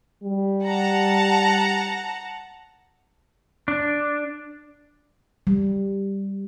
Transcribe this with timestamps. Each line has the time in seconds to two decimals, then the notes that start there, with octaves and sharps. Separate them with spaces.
0.24 G3
0.63 F#5 A5 A#5
3.68 D4
5.47 G3